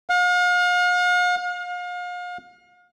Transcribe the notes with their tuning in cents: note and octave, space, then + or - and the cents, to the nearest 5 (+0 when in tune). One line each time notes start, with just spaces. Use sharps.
F5 +45
F5 +35